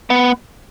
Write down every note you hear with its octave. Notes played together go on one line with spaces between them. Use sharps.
B3